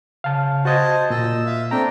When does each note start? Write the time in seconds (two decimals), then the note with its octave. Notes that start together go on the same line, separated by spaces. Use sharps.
0.24 C#3 F5 A5
0.65 F#4 C5 D#5 A5 G#6
1.10 A#2 D#5 E6
1.46 E5 F5
1.71 A3 C4 D4 G5 A#5